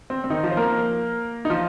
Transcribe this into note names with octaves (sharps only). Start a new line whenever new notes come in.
C4
C4
D#3 D#4
F3 F4
C5
A#3 A#4
D#4
F3 F4